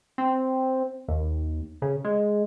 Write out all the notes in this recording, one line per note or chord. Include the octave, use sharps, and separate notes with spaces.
C4
D#2
C#3
G#3